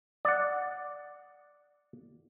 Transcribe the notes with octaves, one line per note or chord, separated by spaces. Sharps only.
D5 F#5